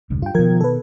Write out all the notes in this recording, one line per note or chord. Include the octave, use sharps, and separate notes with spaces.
E1 C#2 G2
G2 F4 G5
B2 D#3 F3 A#4 G#6
A4 B4